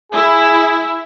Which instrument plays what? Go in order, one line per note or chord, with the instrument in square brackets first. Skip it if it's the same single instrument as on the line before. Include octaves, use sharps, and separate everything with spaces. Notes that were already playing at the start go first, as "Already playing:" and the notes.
[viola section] E4 [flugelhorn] G#4